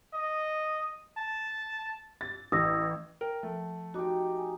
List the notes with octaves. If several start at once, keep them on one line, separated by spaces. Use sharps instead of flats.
D#5
A5
A6
A1 D#6 E6 A#6
A#4 G5
F3 A3
D#4 F#4 G4 D6
G#5